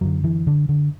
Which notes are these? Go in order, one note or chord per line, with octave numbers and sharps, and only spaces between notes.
F#2 D3 F#3
E3
D3
D3